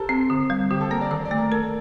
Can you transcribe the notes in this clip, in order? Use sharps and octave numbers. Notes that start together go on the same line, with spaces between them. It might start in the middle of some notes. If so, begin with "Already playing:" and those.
Already playing: G4 A4 A#4 C5
C4
D3
G3
D3 G4
A4
A#3 A#4
D5
D#3 A4
D5
A3
A#4
A4 A#4